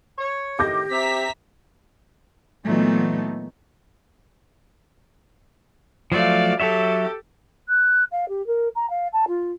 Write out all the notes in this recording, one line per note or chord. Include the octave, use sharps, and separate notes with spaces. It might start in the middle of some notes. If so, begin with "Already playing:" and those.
C#5
A2 D#3 G4 D6 G6 A#6
C4 E5 A#5 B6
A#2 E3 F#3 A3 B3 D#4
F3 F#3 A3 D5 F5
F#3 G4 A4 C#5 E5
F#6
F5
G4
A#4
A#5
F5
A5
F4